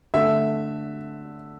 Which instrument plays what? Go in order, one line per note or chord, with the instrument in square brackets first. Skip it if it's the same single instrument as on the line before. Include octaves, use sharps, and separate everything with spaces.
[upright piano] D3 A3 E5